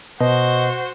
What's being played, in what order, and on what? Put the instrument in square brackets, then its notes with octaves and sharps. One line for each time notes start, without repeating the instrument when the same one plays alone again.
[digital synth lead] B2 [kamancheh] F#4 C5 [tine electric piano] D#5